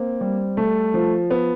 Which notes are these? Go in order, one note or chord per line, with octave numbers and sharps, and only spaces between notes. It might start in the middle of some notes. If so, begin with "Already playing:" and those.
Already playing: A#3 C4
G3
A3
F3
B3